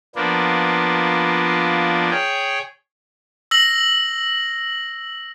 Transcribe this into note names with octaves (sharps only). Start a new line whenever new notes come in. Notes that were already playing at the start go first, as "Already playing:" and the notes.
F3 A#3 B3 D4
G#4 C#5 G5
E6 A#6 F#7